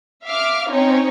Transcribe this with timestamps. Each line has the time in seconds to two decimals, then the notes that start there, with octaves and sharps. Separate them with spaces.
0.24 E5 F5 D6 F6
0.70 C4 C#4 D#4 C#5